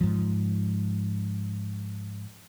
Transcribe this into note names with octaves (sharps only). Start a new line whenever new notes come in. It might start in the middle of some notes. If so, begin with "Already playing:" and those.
G#2 F3